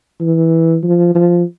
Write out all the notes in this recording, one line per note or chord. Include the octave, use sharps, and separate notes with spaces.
E3
F3
F3